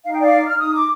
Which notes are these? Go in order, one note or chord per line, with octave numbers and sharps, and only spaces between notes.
D#4 F5
G5
D5 F5
D#4
F6
D#4 D#6
D6